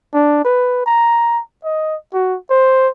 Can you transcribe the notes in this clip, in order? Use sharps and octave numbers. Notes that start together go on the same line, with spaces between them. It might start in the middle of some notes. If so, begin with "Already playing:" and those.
D4
B4
A#5
D#5
F#4
C5